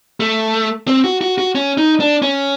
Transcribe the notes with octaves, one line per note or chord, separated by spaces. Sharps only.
A3
C4
F#4
F#4
F#4
C#4
D#4
D4
C#4